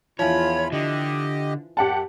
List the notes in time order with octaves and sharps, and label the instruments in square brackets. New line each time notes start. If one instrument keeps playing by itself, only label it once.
[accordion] E2 F4 B5 [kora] E3 F3 [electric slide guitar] C#5
[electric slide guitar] D3 [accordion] G4 D#5
[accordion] F#2 [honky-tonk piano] G4 F#5 A5